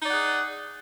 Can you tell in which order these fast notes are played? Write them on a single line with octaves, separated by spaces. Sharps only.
D#4 D5 F#5 G#4